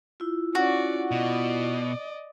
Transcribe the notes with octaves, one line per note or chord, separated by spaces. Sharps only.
E4 F4
C#4 F#4 D5
B2 D5 D#5